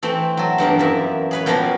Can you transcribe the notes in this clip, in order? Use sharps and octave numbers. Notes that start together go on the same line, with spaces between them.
E3 A3 C4
F#3 A4
E2 G2 F3 A#3
F#2 E3 E5
G#4 B4 C#5
B2 F3 G3 A#3 F4 C#5